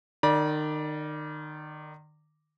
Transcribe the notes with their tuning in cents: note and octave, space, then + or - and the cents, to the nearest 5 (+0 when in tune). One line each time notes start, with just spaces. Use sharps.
D#3 -30 D5 +0 B5 -45